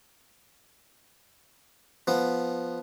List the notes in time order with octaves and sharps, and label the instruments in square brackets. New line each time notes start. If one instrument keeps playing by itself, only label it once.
[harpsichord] F3 B3